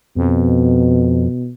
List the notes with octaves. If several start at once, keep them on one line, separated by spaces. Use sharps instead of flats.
F2 B2